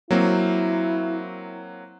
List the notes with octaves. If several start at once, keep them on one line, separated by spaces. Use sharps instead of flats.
F#3 A#3 C4 E4